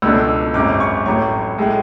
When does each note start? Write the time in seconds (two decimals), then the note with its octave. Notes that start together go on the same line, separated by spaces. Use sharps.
0.02 C#2 B2 A3 D4 E6
0.54 G#1 F#2 C#3 D6
0.80 C#6
1.05 A1 A2 F#3 C#6
1.58 A2 G#3